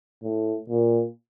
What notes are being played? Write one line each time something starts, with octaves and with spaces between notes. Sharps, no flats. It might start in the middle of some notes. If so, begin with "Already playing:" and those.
A2
A#2